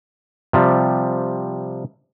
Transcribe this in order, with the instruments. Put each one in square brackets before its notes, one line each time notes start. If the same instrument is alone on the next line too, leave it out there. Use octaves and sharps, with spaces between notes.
[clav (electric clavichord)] C3 F3 G3